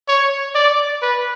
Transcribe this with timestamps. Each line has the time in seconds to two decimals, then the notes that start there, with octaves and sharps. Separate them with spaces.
0.08 C#5
0.55 D5
1.02 B4